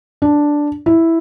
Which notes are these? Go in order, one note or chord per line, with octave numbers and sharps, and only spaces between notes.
D4
E4